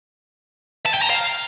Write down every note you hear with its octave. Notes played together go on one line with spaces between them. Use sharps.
A5
G5
A#5
F5